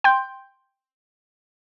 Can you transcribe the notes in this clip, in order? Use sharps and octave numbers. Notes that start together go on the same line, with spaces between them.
G5 C6 G6